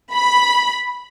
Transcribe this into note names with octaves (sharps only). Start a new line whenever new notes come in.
B5